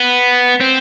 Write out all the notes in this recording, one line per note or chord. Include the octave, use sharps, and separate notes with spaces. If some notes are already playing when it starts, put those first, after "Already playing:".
Already playing: B3
C4